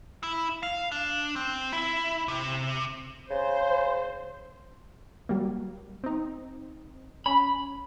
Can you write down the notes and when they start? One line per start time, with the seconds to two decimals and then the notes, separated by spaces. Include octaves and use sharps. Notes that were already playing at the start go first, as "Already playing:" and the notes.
0.23 E4
0.63 F5
0.92 D4
1.36 C4
1.73 E4
2.28 C3
3.30 C#3 C5
5.29 F#3 G3 A#3
6.04 C4 D#4
7.26 C#4 B5